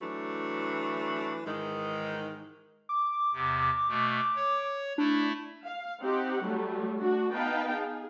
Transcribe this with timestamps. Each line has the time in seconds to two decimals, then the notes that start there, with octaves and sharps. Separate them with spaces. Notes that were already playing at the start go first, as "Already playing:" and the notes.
0.01 E3 F#3 A3 D4
1.46 G#2 D#3 E3 G#3
2.89 D6
3.34 E2 C3
3.89 B2 A3
4.35 C#5
4.98 A3 D4 E4
5.65 F5
6.02 C4 D#4 G4 F#5
6.42 F#3 G3 A3
6.99 A3 D4 F#4
7.33 B3 D#4 B4 F5 G5 A5
7.73 G#4